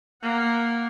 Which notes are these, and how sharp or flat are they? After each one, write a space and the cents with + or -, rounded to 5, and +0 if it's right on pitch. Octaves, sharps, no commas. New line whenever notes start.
A#3 +0 F#5 +0